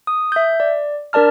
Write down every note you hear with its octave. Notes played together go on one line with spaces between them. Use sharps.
D#6
E5 G6
D5
D4 A#4 D5 A5 F6